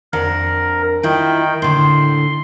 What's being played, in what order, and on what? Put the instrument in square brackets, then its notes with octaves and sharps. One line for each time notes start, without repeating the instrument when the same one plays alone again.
[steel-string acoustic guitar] F2 D4 F#5 [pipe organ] A#4
[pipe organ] D#3 G5 [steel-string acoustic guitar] E4 F4
[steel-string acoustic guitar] A2 D3 [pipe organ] C6